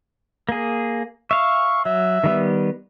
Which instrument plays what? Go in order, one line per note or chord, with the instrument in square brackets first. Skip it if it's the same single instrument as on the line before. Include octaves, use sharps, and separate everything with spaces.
[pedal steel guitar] A#3 G#4
[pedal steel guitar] E5 F5 [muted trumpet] C#6
[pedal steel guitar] F#3 [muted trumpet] E5
[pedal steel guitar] D#3 G3 B3